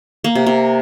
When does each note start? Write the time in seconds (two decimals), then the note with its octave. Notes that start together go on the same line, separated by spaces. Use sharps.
0.24 A#3
0.35 C3
0.46 C3